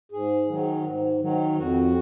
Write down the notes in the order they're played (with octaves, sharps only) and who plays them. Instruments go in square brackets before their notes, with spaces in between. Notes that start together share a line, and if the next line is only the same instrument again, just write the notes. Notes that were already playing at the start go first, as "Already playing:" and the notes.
[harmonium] G#2 G#4
D#3 F#3
G#2
D#3 F#3
F2 F#4